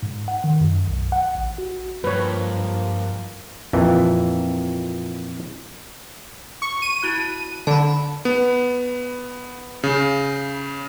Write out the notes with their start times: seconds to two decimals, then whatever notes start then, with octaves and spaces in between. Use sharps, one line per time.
0.03 G#2
0.28 F#5
0.44 D#3
0.60 F#2
0.88 B1
1.12 F#5
1.35 A1
1.58 F#4
2.04 G2 F3 A#3 B4 C#5
3.73 F2 A#2 E3
6.62 C#6
6.82 D#7
7.03 E4 F#4 F#6
7.67 D3 A5 B5
8.25 B3
9.84 C#3